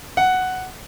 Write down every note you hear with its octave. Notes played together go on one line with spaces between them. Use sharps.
F#5